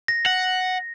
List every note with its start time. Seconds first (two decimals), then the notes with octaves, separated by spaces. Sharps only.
0.08 A#6
0.26 F#5